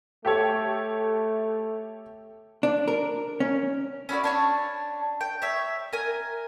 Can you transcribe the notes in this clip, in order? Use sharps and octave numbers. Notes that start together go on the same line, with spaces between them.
A3 G4 A4 C#5
D4
A#4
C#4
C#4 E4 F#4 D5
D4 C#5 A5
G5
C#5 E5
A#4 G#5